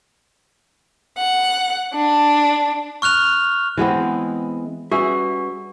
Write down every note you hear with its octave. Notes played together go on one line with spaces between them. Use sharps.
F#5
D4
C#6 F6 F#6 F7
E3 G#3 B3 C4
G3 C#4 F#4 G#4 B4 E5